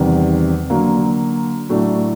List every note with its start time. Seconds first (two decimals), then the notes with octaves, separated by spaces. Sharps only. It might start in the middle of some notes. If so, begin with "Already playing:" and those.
Already playing: E2 C3 D#3 G3
0.70 D3 F#3 A#3
1.69 A2 F#3 A3 D4